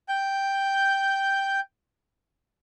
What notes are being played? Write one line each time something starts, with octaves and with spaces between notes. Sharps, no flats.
G5 G6